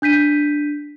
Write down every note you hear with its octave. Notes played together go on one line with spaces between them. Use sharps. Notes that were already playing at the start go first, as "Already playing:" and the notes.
D4 G6 B6 D#7